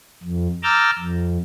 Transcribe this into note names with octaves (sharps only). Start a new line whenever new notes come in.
F2
A#5 D6 E6 F6 G6 A6
F2